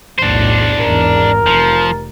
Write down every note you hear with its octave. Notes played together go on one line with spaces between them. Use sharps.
B1 E2 A2 D4 C5
G#1 E2 A#4
F1 F3